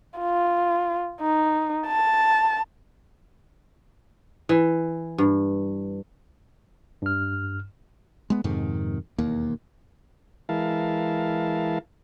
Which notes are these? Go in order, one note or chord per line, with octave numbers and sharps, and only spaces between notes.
F4
D#4
A5
E3
G2
G2 F6
G#3 B3
F2 G#2 C3 D#3
E1 D#2 A#3
E3 G#3 E4 A#4 F5 A5